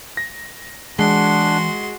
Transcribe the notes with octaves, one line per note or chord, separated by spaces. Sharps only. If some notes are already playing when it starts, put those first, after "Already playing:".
A#6
E3 G#3 D4 F#4 F#5 C6